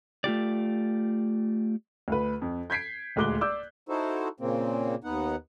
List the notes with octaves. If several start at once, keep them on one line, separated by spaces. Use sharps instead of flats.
A3 F4 G4 D5
D2 B4
F2
G6 G#6 B6 C7 D7
D#1 D2 G#3 D6 F#6 G7
D5 D6 E6 G6
D#4 E4 F#4 A4 C5
A#2 C#3 A#3 C4
D#2 B3 D#4 F#5